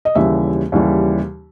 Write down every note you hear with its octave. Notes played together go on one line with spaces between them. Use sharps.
D#5
D#2 C#3 E3 G3 E5
D#2 C#3 E3 G3